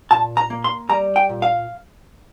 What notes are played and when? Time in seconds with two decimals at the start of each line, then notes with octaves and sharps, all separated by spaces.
0.11 A#2 A5
0.37 A#5
0.50 A#3
0.64 C6
0.90 G3 A#5
1.16 G5
1.29 A#2
1.42 F5